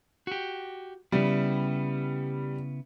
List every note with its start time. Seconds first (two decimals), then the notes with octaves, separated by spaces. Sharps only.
0.27 F#4 G4
1.12 C#3 G3 B3 E4